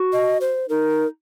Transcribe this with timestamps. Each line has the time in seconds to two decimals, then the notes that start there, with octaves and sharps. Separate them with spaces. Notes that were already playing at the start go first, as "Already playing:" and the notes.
Already playing: F#4
0.13 D#5
0.41 C5
0.69 D#4 A#4